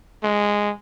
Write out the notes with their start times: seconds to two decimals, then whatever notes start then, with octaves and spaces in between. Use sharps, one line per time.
0.23 G#3